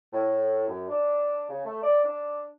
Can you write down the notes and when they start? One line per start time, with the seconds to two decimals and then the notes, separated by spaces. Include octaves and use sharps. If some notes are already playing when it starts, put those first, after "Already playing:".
0.13 A2
0.68 F#2
0.88 D4
1.49 C#3
1.65 A3
1.82 D5
2.04 D4